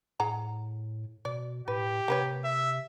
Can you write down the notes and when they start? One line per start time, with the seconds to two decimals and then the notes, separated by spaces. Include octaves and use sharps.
0.20 A2 G#4 F#5 A#5
1.25 B2 D5
1.68 A2 G4 B4
2.08 C3 A#3 B4 C#5
2.44 E5